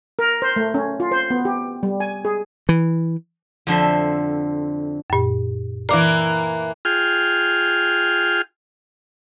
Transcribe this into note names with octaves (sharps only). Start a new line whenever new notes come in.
A#4
C5
A3
C#4
F4
C5
B3
G4
G3
G#5
G#4
E3
F2 D3 C5 E5
F#2 A#2
E3 A#3 A#4 D5 D6
F4 G#4 G5 F6